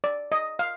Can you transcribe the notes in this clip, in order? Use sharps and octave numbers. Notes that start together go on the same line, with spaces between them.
D5
D#5
F5